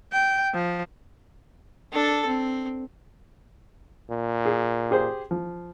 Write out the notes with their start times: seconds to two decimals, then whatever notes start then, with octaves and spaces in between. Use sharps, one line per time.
0.12 G5
0.54 F3
1.92 D4 A4
2.26 C4
4.10 A#2
4.45 G#4
4.91 G4 G#4 C5
5.31 F3